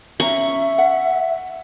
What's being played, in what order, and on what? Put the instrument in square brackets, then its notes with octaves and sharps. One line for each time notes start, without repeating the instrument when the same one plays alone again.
[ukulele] C#4 A#5 [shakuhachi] E5 [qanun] C#6
[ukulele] F#5